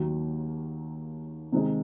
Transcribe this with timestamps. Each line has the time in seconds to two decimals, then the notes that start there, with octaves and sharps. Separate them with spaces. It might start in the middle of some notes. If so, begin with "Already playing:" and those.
Already playing: D#2 D#3 F#3 A#3
1.52 C3 D#3 G#3 D#4 G#4